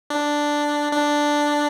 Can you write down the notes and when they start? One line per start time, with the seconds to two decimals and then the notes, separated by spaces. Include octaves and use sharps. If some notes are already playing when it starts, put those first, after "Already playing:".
0.10 D4
0.92 D4